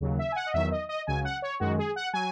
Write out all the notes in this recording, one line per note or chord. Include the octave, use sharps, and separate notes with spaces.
D#2 C#3 F#3
E5
G#5
F#5
D#5
E2 D#3 F#3 E5
D#5
D#5
C#2 C#3 F#3 G#5
F#5
C#5
F#2 D#3 G#3 F#4
G#4
F#5
F#3 G#5